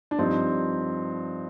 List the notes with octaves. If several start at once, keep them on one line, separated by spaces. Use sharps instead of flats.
D4
G2 F3 C4 D#4